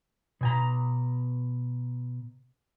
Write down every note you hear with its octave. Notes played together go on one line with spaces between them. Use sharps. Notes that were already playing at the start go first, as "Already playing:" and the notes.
B2 G#5 A#5